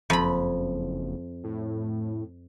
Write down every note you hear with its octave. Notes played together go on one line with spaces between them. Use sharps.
F#1 F2 B5
A2